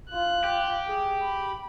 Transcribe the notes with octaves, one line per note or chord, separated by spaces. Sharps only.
F4 F#6
G4
G#4
B5